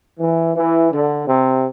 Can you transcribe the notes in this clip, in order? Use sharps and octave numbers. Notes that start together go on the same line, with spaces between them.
E3
E3
D3
C3